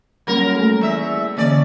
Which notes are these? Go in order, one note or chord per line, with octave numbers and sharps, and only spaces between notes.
F#3 G3 A#3 C#4 A#4
A3 A4
E2 E5
D3 E3 A#3 C#4 D5